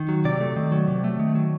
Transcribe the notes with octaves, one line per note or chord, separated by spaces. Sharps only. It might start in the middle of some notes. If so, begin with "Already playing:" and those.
Already playing: D#3
F#3
C3 D5
A3
D#3
F#3
C3
A3
D#3
F#3